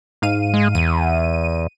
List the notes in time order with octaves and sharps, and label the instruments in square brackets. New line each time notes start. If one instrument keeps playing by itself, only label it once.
[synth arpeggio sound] G#2 F5 D#7
[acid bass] G#3
[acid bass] E2 [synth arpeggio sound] D#7